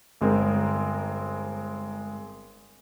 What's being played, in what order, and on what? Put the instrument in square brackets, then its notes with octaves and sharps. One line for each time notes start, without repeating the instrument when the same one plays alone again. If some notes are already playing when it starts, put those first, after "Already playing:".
[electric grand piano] G1 G#3 C4 A#4